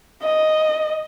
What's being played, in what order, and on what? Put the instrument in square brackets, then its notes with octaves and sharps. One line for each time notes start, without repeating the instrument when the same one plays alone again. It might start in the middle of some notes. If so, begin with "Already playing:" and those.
[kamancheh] D#5